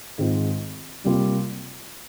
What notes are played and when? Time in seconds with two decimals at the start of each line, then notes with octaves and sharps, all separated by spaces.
0.18 G#2 D#3 G#3 C4 F4
1.04 C3 G3 A#3 F4